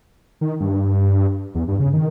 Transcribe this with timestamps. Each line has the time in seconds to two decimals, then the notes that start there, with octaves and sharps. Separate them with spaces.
0.41 D#3
0.60 G2
1.55 E2
1.68 G2
1.80 C#3
1.93 D#3